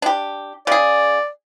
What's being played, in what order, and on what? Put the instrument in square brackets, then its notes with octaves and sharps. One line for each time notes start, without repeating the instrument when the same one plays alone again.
[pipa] D4 G4
[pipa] C#3 G#4 [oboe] D5